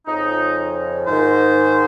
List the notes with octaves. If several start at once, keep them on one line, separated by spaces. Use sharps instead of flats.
F2 C#3 F3 D#4
G#2 D#3 C5